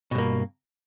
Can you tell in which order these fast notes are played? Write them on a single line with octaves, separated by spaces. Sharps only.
B2 G2 A#3